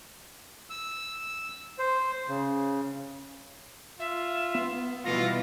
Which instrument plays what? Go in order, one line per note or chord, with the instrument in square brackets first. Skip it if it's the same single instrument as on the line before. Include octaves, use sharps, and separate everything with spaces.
[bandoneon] E6
C5
C#3
[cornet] F4 [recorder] E5
[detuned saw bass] B3
[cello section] B2 E3 G3 [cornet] F4 [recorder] A#6